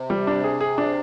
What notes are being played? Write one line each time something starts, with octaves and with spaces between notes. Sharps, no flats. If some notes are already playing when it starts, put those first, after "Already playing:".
Already playing: C3
G3
D4
G#4
G#4
D4